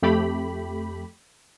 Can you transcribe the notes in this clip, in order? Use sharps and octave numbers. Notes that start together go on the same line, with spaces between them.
F2 A3 G4 B5